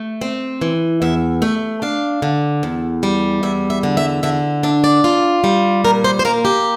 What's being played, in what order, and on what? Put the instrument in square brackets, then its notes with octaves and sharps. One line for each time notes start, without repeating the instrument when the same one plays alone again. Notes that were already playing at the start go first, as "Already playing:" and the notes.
Already playing: [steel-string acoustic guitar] A3
C4
E3
E2 E5
A3 E5
D4 F5
D3
E2
G3
E2 E5
E5
D3
E5
D3 E5
D4 E5
D5
F4
G3
A#2 A#4
C5
C5
A#3 A#4
G4